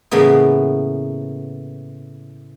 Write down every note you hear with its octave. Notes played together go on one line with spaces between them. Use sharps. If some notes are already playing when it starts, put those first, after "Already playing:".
A2 C#3 E3 A#3 B3